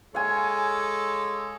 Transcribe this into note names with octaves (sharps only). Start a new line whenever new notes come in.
G#3 A4 C#5 F5 G#5